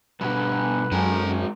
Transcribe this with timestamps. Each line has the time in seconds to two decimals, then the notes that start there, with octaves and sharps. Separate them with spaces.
0.21 G2 B2 D3 G3 B4
0.92 F#2 D#3 G#3 A4 A#5